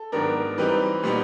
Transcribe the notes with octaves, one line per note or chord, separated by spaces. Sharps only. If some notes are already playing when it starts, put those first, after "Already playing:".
Already playing: A4
G#2 D#3 F#3 B3 D4 A#4
E3 G3 C4 D#4 B4
A#2 G3 B3 D#4